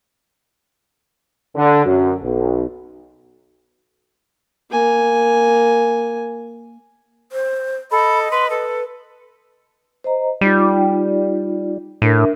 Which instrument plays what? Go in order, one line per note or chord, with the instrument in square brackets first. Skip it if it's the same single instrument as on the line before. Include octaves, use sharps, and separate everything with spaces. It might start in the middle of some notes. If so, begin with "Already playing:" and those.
[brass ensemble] D3
F#2
B1
[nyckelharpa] A#3 G#5
[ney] C5
[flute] A4 [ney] D#5 [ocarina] B5
[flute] B4 [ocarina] C6
[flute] A4 [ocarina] B4
[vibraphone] C5 D#5 A#5
[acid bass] G3 [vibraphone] D#4 F4
[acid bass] A2 [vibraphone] D4 A#4 E5